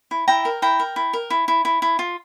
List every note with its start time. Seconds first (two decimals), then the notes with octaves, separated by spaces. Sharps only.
0.11 E4
0.28 E4 G5 A#5
0.45 A#4
0.62 E4 G5 A#5
0.79 A#4
0.96 E4
1.13 A#4
1.30 E4
1.48 E4
1.65 E4
1.82 E4
1.99 F4